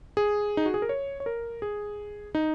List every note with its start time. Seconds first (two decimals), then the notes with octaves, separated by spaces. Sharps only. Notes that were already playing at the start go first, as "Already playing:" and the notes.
0.17 G#4
0.57 D#4
0.66 F#4
0.74 G#4
0.82 A#4
0.89 C#5
1.20 C#5
1.26 A#4
1.62 G#4
2.35 D#4